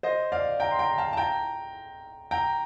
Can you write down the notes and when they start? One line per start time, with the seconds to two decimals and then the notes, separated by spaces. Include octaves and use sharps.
0.03 C5 D#5
0.32 D5 F5
0.60 G5 A#5
0.71 C6
0.79 G5 A#5
0.98 F5 A5
1.13 A5
1.17 G5 A#5
2.31 G5 A#5